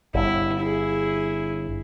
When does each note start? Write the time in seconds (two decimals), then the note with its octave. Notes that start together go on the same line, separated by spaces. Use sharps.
0.14 G1 E4
0.60 E4 G#4